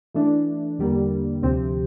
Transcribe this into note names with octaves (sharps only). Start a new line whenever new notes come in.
E3 A3 D4
E2 D3 G3 A#3
D2 C3 F3 C4 G4